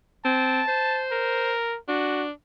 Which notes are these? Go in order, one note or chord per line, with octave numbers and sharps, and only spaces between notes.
C4 A5
C5
A#4
D4 F#4